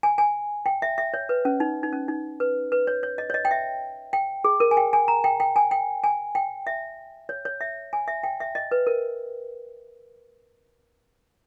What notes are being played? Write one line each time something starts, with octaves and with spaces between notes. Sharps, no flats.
G#5
G#5
G5
E5
E5
C#5
B4
C#4
D#4
D#4
C#4
D#4
B4
B4
C#5
C#5
D#5
C#5
D#5
G5
E5
G5
G#4
A#4
G#5
G5
G#5
A#5
G5
G5
G#5
G5
G#5
G5
E5
C#5
C#5
E5
G#5
E5
G5
E5
D#5
B4
A#4